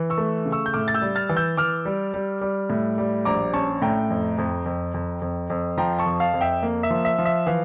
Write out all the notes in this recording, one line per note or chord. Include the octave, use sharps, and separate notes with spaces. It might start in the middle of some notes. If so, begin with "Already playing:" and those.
Already playing: E3
C#6 E6
A3
C#3
C#6 E6
G6
A2 D6 F6
A6
E6 G6
G3
F6 A6
E3
E6 G6
E3 D6 F6
G3
G3
G3
A2
G3
A#1 A#5 D6
C#4 A5 C#6
A2 G5 A#5
F2
F2
F2
F2
F2
F2
F3 G5 A#5
A5 C#6
F2
F5 A5
F2
E5 G5
A#3
E5
F3
E5
F3
E5
E3 F5